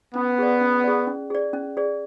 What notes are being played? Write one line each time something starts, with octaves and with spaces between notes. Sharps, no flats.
B3 C#4
G#4 D5
C#4
G#4 D5
C#4
G#4 D5
C#4
G#4 D5